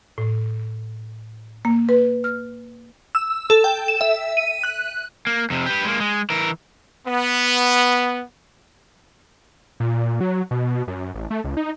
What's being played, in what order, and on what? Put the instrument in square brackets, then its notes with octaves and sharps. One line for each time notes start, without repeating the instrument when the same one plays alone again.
[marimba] A2
A#3
B4
F6
[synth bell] E6
A4
G5
E7
E5
D#7
F#6
[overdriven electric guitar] A#3
F2 C3
G4 B4
G#3 A#3
G#3
E3 A#4
[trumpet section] B3
[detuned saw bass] A#2
F#3
B2
F#2
A1
A3
C#2
D#4